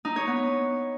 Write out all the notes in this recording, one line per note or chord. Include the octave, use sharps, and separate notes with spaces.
D#4
C#5
B3